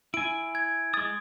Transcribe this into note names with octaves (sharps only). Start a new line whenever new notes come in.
E4 G#5 D7
G#6
G#3 D#6 A6